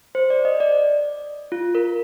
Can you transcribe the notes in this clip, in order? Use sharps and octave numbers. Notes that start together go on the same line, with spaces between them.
C5
D5
D#5
D5
F4
A#4